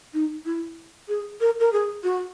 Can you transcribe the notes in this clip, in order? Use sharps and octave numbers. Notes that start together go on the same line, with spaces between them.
D#4
E4
G#4
A#4
A#4
G#4
F#4